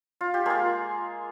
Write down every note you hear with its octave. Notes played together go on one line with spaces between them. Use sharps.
F4
G4
G#3 A#3 F4 G#4